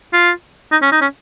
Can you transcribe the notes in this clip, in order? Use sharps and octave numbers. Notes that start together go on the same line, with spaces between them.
F4
D#4
C#4
D#4
C#4